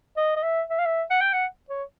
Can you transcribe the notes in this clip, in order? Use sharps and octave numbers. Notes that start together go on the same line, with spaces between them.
D#5
D#5
E5
E5
F5
E5
F#5
G5
F#5
C#5